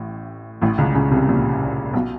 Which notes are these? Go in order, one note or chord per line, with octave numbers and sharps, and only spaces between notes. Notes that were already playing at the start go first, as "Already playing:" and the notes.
Already playing: A1 A2
A1 A2
C#2 C#3
C#2 C#3
C2 C3
A#1 A#2
B1 B2